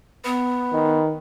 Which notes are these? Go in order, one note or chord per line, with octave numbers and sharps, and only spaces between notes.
B3 B4
D#3